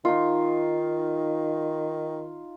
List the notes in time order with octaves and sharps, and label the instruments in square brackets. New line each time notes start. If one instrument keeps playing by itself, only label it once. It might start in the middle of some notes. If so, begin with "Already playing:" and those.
[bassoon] D#3 [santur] D#4 F4